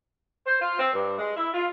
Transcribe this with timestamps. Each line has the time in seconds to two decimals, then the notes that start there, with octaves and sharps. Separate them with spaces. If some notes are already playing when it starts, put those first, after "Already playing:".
0.46 C5
0.60 F4
0.79 C4
0.93 G2
1.18 G#3
1.36 E4
1.54 F4